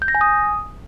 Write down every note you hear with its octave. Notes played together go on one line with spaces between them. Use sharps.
G6
A#6
G#5
D#6